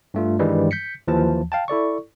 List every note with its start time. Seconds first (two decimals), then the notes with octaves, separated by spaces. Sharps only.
0.14 G2 A3 F4
0.39 G2 D#3 E3 G3 G#3
0.71 G6 B6 C#7
1.07 D#2 E3 F3 A5
1.52 F5 G5 A5
1.68 E4 A4 D5 C#6